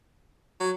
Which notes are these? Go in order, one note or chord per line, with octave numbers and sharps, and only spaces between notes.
F#3